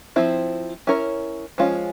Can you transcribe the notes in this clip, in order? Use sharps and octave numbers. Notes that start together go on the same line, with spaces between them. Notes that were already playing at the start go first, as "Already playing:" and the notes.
F3 C4 E4
C#4 E4 A#4 C#5
F3 G#3 C#4 F4